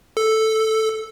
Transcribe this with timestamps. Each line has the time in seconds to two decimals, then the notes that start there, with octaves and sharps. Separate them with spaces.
0.17 A4